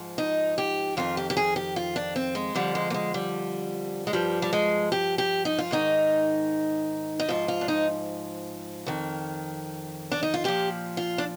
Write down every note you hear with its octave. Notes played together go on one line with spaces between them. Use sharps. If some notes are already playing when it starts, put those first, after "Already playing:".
Already playing: G#2 F3
D#4
G4
F2 D#3 F4
G4
G4
G#4
G4
F4
D4
C4
G#3
F2 D3 F3 G3
G#3
A#3
G#3
G3
G#3
G2 F3 G3
G3
G#3
G4
G4
D#4
F4
G#2 D#3 D#4
D#4
G#2 F3 F4
F4
D4
D#4
F2 D#3
D4
D#4
F4
A#2 F3 G4
F4
D4